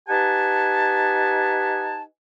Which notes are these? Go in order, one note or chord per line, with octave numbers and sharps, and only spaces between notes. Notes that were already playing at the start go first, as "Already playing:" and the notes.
D#4 G4 B4 F#5 G#5 A5